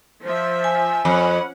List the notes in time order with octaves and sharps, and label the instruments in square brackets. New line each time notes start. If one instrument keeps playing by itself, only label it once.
[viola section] F3 E5 [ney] C5
[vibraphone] G#5
[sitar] F2 [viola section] C#4 F#5 [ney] B5